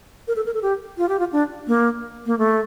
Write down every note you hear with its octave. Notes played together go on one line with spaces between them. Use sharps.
A#4
A4
A#4
A4
G4
F4
G4
F4
D4
A#3
A#3
A3